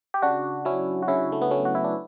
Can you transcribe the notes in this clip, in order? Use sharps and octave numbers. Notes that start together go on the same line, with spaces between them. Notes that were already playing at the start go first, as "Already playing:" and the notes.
G4
C#3 D4 F#4
F#3 C#4 E4
F#4
C#3 C#4 E4
A3
B3
F#3 A3 C#4
F#4
E4
D4